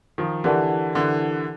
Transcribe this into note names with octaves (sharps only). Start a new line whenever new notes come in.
D#3 F3
D3 E3 G4 A#4 D5 F#5 A5
D3 E3